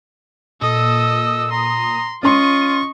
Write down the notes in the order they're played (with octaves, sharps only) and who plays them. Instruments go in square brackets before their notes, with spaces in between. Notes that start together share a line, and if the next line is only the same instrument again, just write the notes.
[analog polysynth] A#2 D#6 [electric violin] A4 D#5 [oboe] E6
[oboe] A#5 [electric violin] C6
[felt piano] C#4 C6 [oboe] F4 [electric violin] D#5 C#6 [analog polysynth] D#7